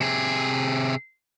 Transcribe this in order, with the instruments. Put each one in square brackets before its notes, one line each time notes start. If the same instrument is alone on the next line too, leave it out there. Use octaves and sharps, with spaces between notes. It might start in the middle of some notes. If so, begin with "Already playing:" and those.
[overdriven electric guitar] C3 G#4